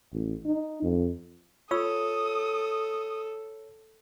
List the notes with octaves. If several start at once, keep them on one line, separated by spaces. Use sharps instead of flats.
A1
D#4
F2
F4 A4 C#5 D#6 E6